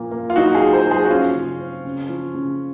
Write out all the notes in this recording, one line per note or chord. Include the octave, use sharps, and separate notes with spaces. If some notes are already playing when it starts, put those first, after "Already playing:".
Already playing: A#2 F3 A#3
A#3
F4
F#3 D#4 F#4
F4 G#4
F#3
G#4 C5
F#3
G#4 C5
F#4
F3 C#4 F4
C#3
C4
C#3
F3
C#3